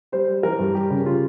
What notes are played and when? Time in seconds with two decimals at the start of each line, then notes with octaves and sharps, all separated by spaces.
0.12 G3 C5
0.28 G3
0.43 E3 A#4
0.59 G2
0.75 G3 G4
0.90 C#3
1.06 F4